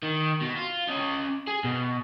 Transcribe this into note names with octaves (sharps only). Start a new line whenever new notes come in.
D#3
B2
F4
C#4 D#5
G#4
B2